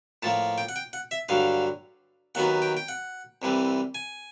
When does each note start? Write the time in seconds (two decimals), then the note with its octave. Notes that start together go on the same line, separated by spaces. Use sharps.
0.23 A2 F3 A#3 A5
0.58 G5
0.69 F#5
0.76 G5
0.93 F#5
1.11 E5
1.29 G2 D3 F#3 F5
2.35 D#2 D#3 F#3 B3 F#5
2.62 G5
2.77 G5
2.88 F#5
3.42 C2 C3 E3 G3
3.95 G#5